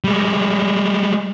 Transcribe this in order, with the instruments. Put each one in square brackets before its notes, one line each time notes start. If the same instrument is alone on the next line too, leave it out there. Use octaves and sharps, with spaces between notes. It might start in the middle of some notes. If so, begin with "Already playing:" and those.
[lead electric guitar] G3 G#3